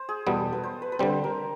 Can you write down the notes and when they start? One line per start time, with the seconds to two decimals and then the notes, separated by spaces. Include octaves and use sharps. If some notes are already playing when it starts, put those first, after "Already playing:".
Already playing: C5
0.09 G#4
0.26 E2 B2 G3 B3 A4
0.53 B4
0.64 C5
0.82 B4
0.92 B4
0.99 D3 G3 C4 C5
1.24 A#4